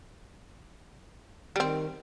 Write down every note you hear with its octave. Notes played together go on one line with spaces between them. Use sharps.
D#3 G3 C4